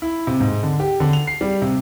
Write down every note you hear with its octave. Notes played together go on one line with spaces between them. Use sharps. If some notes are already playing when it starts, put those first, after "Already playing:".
E4
C3
G#2
D3
G4
D3
F7
C7
G3
C3